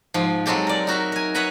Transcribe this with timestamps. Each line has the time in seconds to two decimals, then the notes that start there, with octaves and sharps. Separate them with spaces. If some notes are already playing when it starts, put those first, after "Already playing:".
0.14 G#2 F3
0.46 F#3 G#3 C4 G4 A4
0.67 A#4 D5
0.87 D#4 F#4 A#4 E5
1.12 A#4 G#5
1.34 B4 C#5 D#5 E5 F#5 A#5